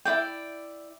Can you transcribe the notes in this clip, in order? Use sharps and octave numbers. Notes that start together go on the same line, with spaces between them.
E4 F4 D5 G5